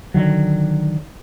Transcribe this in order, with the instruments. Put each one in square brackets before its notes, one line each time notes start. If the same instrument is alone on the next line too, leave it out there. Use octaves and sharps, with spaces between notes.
[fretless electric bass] D3 D#3 F#3